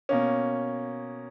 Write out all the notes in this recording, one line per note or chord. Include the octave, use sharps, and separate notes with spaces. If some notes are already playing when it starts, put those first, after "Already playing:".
B2 A#3 C#4